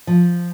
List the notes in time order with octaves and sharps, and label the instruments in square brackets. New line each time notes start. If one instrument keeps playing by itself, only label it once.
[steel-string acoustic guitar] F3